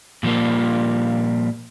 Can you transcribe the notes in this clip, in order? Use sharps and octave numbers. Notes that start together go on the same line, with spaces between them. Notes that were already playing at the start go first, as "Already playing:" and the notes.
A#2 F3 G3 A#3